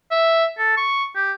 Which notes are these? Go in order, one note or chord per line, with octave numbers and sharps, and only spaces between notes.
E5
A4
C#6
G4